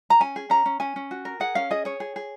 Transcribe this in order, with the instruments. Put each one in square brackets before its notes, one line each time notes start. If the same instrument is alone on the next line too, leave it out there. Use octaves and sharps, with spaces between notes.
[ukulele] A#5
C#4 G#5
G#4
C#4 A#5
C#4
C#4 G#5
C#4
F#4
A#4
G#4 F#5
C#4 F5
G#4 D#5
G#4 C#5
G#4
G#4